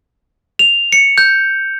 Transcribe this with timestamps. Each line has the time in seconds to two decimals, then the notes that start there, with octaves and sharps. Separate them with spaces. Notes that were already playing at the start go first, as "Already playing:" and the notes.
0.59 F7
0.93 C#7
1.18 G6